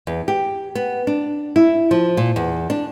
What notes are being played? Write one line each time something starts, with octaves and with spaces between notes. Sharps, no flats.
E2
G4
B3
D4
E4
F3
A#2
E2
D4